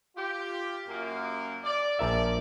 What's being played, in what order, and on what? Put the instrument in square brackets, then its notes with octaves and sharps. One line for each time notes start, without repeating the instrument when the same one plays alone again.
[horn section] F4 G4
F#2 A#3
D5
[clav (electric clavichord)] A#1 A#4 E5 [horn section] F3 D5